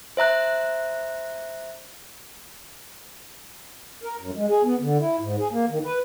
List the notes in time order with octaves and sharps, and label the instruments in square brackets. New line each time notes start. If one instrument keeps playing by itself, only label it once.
[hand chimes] C5 E5 A#5 F#6
[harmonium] A#4
F#2
G#3
G#4
B3
D3
E4
G#2
G#4
A#3
D#3
B4